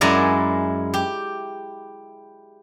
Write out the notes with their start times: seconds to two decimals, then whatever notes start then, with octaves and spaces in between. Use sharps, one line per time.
0.01 F#2 G#3 E4 D5 G#5 A#5
0.94 G4